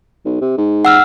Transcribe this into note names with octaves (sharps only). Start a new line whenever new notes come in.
B1
C3
G#2
F#5 E6 F6